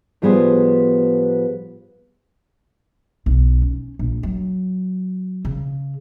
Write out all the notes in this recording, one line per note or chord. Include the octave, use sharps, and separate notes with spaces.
A2 F3 G3 B3 G#4 C5
B1
C#4
A#1
F#3
C#3